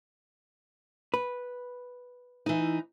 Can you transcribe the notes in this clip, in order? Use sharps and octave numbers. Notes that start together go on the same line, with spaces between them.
B4
E3 D#4